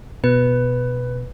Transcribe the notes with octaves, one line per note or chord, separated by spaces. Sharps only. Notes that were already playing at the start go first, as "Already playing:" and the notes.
B2 B4